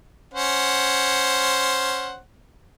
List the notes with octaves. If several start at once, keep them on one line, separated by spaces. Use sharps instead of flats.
C#4 C5 F#5